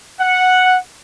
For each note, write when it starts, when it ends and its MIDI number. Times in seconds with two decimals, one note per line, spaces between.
0.20 0.77 78